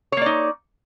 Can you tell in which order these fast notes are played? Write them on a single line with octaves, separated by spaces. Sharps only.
C#5 A#3 D5 D#4